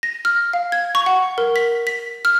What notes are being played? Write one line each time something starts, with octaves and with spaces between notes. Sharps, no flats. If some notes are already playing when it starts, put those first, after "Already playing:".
A#6
F6
F5
G#6
C#6
F#5
A#4
B6
B6
F6